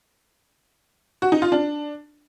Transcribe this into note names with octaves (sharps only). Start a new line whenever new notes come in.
F#4
D#4
F4
D4